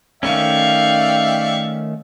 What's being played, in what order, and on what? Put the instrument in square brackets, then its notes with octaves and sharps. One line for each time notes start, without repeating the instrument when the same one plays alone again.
[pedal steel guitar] D#3 A3 C#4 [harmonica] D5 E5 G5 [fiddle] F5 C#6